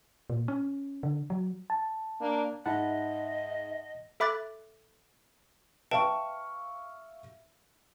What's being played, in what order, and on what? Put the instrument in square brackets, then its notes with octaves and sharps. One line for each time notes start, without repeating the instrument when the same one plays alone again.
[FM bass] A#2
C#4
D3
F#3
[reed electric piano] A5
[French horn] A#3 [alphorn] D4
[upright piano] G#2 [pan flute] D#5 [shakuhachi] E5 [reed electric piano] F#5 A5 B5
[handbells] A4 E5 B5 D6 F#6 A6
[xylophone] B4 G5 A5 [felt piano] E5 F5 C#6